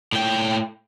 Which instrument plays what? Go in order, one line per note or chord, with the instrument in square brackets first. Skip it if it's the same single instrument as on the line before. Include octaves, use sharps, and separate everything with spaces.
[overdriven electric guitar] A2 G5